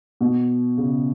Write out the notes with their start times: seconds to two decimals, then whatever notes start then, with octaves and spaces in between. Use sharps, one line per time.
0.21 B2
0.78 C#3